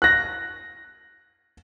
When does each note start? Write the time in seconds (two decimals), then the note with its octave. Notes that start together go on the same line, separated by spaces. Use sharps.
0.02 F#6 A#6